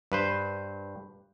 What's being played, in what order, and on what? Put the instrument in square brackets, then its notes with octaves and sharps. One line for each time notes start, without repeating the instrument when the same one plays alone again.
[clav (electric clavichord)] G2 B4 C5